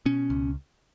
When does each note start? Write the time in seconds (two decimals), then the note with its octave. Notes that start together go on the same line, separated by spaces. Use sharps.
0.06 B2 C#4
0.30 C#2